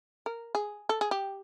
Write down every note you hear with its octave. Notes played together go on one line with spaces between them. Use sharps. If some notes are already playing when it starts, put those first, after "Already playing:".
A#4
G#4
A4
G#4
G4